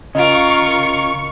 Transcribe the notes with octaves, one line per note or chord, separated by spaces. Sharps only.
C#3 F4 A#4 D#5 F5 C#6 D7